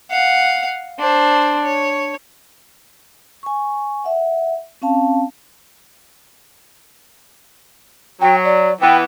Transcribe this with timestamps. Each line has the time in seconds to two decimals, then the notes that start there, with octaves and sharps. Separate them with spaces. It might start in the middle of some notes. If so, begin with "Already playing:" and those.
0.11 F5 F#5
0.99 D4 C5
1.64 C#5
3.43 G#5 C#6
4.04 E5 F#5
4.82 C4 C#4 F5 A5
8.21 F#3 G5
8.44 D5
8.81 E3 B3 G5